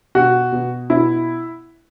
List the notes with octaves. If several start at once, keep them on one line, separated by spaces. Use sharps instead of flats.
B2 F#4
B2
B2 E4